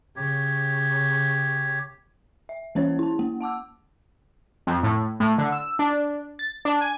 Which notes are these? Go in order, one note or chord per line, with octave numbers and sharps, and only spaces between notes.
C#3 G4 C#5
E5
E3 A#3 C#4 C5 C#5
E4 A5
A#3
F#5 A5 D6 E6
F2
A2
A2
D3
E6
D4
A6
D4
G#5